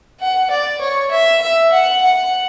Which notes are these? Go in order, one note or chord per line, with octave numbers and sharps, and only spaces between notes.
F#5
D5
C#5
E5
E5
F#5
F#5